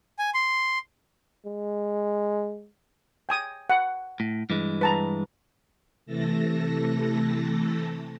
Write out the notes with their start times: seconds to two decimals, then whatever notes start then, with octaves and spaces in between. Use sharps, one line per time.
0.19 G#5
0.34 C6
1.45 G#3
3.29 G5 G#5 D#6
3.70 F#5
4.20 A2
4.50 G2 E3 G#3
4.81 B4 A5 A#5
6.06 C3 E3 A3 A4 A5 A#6